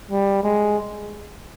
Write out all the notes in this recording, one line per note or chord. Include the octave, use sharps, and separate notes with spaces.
G3
G#3